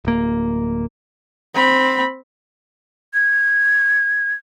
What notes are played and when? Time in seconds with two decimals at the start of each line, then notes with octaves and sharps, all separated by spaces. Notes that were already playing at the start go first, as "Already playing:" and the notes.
0.05 D1 A#3
1.55 C4 B5
3.14 G#6